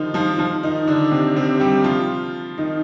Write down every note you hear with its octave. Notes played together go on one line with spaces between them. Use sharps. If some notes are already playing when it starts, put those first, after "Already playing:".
Already playing: D3 D#3 F3 D#4 F4
F3 F4
F3 F4
D#3 D#4
D3 D4
C3 C4
C3 C4
G3 G4
F3 F4
D#3 D#4